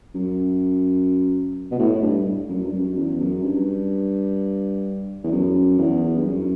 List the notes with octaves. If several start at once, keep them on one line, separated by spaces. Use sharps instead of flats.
F#2
B2
A2
A2
G2
F#2
G2
F#2
E2
F#2
G2
E2
F#2
E2
G2
F#2